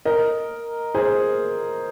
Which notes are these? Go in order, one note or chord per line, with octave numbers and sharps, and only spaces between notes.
A#4 D#5
G#4 C5